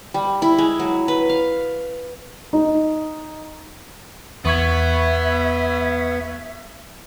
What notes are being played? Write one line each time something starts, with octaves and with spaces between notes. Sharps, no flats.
G3
E4
G#3
F#3
B4
F5
D#4
E2 B3 E5 C#6 G#6